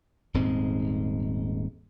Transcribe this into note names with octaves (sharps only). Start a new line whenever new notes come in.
D#1 G#2 G#3 C4